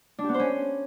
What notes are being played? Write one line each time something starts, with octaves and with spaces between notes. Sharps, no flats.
D4
G4
B3
C5
C#4